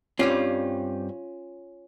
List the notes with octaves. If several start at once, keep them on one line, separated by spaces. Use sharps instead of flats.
G2 G3 C4 C#4 F4